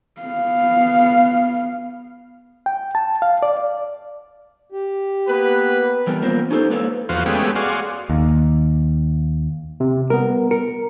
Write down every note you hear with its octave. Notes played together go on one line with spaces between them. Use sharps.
B3 F5
G5
A5
F5
D5
G4
A#3 B3 B4
E3 G3 B3 A#4
A#3 B3 C#4 F4 A#4 C5
C#4 D#4 G4 A4 C5
G#3 A#3 A4 B4 C#5
E2 F3 B3 F#4 C5 F5
G#3 A3 B3 C#4 G4
F#4 G#4 D5 F5 C6 C#6
D#2
C3
G3 B3 A#4
A#4 C#7